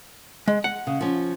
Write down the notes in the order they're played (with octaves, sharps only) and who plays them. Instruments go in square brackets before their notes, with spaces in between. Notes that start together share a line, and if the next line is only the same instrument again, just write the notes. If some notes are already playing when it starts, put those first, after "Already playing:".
[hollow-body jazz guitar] G#3
F#5
[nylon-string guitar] C#3
F3 C#4